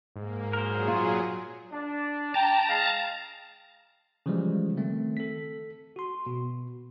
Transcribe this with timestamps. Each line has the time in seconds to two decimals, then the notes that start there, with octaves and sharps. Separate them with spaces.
0.16 G#2 A#3
0.53 A#2 F#3 G#4 A#4 C5
0.88 F4
1.72 D4
2.34 G5 A5 A#5
2.69 G#3 F5
4.26 C#3 E3 F3 G3 G#3
4.77 D#3 A3 C4
5.17 A4 B6
5.96 F#4 C6
6.26 B2